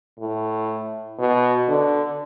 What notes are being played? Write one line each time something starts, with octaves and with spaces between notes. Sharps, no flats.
A2
B2
D3